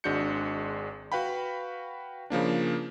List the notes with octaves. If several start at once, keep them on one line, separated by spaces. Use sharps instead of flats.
G#1 G#3 D4 F#4 G6 C#7
F#4 B4 F5 G5 B5
C#3 F3 A#3 D4